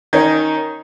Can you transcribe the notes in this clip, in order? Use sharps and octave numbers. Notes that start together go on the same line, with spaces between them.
D#3 C#4 D#4